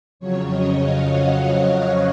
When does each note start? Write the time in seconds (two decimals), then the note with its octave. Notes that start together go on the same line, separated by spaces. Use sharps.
0.20 F2 C#3 F#3 C#5
0.50 D#5
0.80 F5
1.12 F#5